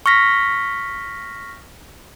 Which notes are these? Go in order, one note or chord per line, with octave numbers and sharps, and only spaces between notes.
C#6 F6 A#6 B6